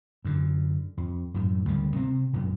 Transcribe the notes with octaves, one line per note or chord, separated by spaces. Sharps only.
F#2 D3
F2
F#2 A2
D2 C#3 G3
C3 C4
A#1 F#2 A#2